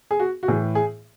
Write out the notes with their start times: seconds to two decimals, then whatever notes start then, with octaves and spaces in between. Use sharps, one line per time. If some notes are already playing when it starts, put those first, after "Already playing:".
0.11 G#4
0.19 F#4
0.43 F#4
0.48 A2 E3 G#4
0.75 G#4